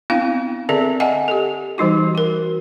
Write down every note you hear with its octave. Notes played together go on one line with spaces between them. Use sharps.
B3 C4 D4 E4 F5 G5
D3 C4 G#4 A4 D5 E5
D#5 E5 F#5 G#5 A5
G4 A4
E3 G3 D#4 F#4
F#4 A#4